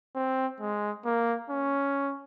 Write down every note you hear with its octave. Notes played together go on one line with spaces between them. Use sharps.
C4
G#3
A#3
C#4